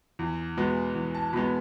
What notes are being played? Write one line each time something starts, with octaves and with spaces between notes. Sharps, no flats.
E2
B2 G#3 B3
E2
A5
B2 G#3 B3 B5